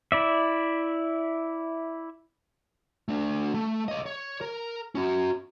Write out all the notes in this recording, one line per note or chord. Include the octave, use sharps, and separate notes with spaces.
E4 D5 E5
A3 D4
A3
C#5 D#5
C#5
A#4
C#4 F#4